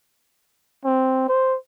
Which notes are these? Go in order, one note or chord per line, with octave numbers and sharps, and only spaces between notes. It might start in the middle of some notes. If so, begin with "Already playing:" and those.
C4
C5